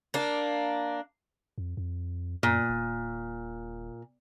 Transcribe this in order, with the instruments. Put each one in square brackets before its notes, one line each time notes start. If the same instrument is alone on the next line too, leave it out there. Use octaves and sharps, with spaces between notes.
[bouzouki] A#3 D4
[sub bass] F2
F2
[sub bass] F#2 [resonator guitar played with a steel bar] A#2
[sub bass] D#1